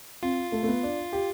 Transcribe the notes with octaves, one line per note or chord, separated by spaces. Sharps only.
C4 F4
A3
A3
B3
D4
G4